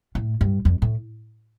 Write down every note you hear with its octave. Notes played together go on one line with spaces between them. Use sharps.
A2
G2
F2
A2